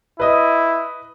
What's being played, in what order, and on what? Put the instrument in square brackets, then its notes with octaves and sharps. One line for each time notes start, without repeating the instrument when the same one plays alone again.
[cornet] E4 [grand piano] B4 D#5 D#6